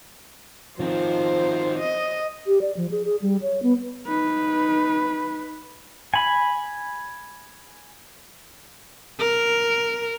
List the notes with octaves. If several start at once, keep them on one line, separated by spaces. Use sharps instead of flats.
D#3 F3 C4 C5
D#5
G4
D5
F3
G#4
G#4
G3
C#5
B3
D#4 B4
G#5 B5
A#4